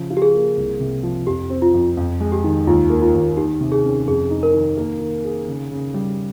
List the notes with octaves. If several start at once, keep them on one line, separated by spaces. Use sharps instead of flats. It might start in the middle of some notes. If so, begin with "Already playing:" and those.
Already playing: C#3 F3
F4
G4
G#4
A#3
C2
C3
F3
F2 G4
C4
F4
F2
F2
G#3
G4
D#3
D#2 F4
A#3
F4
D#2
D#3 G4
C3
G#4
C#4
F2 G#4
D#4
A#4
D#3
A#3
D#3
G#4
C#3
C#3
G3